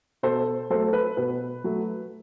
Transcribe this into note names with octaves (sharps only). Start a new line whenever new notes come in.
B2 A4 C5
F#3 A3 A4 C5
B4
B2 B4
F#3 A3